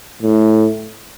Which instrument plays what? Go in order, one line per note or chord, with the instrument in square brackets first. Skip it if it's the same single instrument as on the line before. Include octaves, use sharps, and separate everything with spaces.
[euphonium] A2